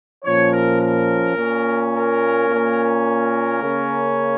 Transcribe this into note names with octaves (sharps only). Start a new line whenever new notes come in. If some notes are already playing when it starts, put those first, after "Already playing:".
A#2 F3 C#4 C#5
A#4
A#4
A#2 A#3 C#4
A#4
A#2 A#3 C#4
A#4
C#3 A#3 C#4